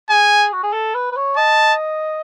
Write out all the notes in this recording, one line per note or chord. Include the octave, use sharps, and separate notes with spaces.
G#4 G#5
F#4
G#4
A4
B4
B4
C#5
D#5 A5